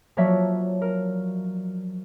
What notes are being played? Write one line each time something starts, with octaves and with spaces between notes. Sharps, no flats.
F3 F#3 A#3 C#5 D5 E5
A#4